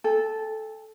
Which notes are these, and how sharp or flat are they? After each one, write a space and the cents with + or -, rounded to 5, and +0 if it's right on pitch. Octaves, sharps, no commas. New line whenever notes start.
A4 -10 G5 +45